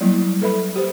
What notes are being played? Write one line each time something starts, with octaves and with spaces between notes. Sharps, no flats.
F#3 G3 A#3 E4
A4 B4 E5 B5
G4 C5